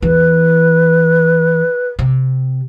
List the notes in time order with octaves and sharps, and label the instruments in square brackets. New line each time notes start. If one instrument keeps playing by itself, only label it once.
[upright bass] E2 E3 [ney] B4
[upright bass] C3